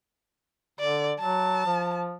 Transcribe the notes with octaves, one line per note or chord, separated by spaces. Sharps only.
D3 D5
F#3 A5
F3